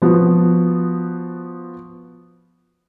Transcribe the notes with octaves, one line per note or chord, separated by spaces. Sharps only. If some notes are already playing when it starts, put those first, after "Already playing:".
F3 B3 F#4